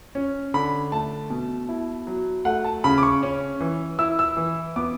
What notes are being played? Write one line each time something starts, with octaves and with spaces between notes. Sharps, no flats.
C#4
D3 B5
A3 A5
B2
E4
F#3
A3 F#5
A5
C#3 B5
D6
C#6
C#4
E3
E4 E6
E6
E3
B3 D6